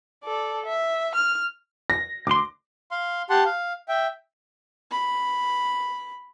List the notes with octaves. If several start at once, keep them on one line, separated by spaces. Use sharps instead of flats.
A4 D5
E5
F6
A#6
D2 C6 D6
F5 C6
G4 F#5 A5 C6
F5
E5 G5
B5